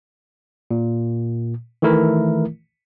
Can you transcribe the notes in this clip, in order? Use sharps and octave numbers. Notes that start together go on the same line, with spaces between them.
A#2
D#3 E3 A3 E4 A#4